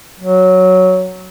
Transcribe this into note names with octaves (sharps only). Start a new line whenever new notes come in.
F#3